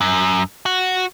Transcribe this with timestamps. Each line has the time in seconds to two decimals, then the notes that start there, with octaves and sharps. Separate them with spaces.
0.01 F#2
0.66 F#4